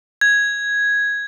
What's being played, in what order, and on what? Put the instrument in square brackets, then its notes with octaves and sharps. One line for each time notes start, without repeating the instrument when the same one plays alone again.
[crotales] G#6